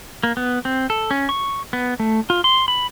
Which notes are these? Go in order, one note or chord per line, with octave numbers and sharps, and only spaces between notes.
A#3
B3
C4
A4
C#4
C#6
B3
A3
F4
C6
B5